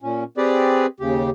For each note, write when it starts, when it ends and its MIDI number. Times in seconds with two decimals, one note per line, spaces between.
0.02 0.24 46
0.02 0.24 61
0.38 0.86 60
0.38 0.86 67
0.38 0.86 68
0.38 0.86 71
0.38 0.86 74
1.00 1.30 39
1.00 1.30 49
1.00 1.30 67